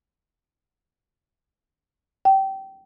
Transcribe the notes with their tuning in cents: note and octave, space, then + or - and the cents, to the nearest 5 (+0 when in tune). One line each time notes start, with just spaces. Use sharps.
G5 -20